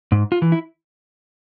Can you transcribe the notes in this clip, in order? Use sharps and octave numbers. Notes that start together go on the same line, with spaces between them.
G#2
F4
E3
E4